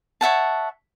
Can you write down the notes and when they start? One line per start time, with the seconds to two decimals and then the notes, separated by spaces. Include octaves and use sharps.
0.21 C#5 E5 F#5 A5